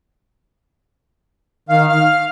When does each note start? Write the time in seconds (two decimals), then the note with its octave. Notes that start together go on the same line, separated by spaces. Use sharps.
1.69 D#3 F5
1.89 F5 F6